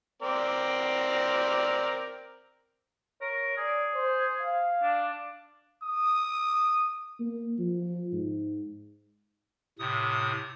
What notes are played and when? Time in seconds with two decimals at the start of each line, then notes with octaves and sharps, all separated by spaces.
0.22 C4 A#4 D5
3.21 A#4 C#5
3.58 G#4 D5
3.95 C5
4.41 F5
4.83 D4
5.83 D#6
7.20 A#3
7.59 F3
8.12 G#2
9.79 A2 C3 D#6